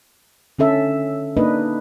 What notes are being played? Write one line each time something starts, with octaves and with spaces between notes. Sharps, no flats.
D3 C#4 A4 E5
A#3 D4 D#4 B4 D#5